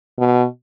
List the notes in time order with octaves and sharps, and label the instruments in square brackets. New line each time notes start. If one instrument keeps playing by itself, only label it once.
[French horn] B2